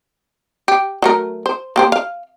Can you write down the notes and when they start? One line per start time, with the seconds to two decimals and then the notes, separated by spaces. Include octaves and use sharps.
0.68 G4
1.02 F#3 A3 A#4
1.46 C5
1.76 A#3 G4 C5
1.92 F5